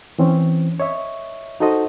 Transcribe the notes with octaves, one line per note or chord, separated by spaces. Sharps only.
E3 C4 C#4
C#5 D#5 E5
D#4 F#4 A4 C5 D#5